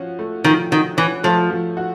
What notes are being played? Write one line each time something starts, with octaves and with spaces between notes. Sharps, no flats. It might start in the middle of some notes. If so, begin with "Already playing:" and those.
Already playing: F3 C#4 F#4
A3
D#3 F3
D#3 F#4
E3 C#4
F3 A3
F3
F#4